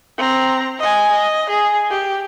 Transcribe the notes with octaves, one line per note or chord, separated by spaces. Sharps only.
C4 A#5
D#5 G#5
D#5
G#4
G4